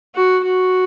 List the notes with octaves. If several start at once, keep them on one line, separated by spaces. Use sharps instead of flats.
F#4
F#4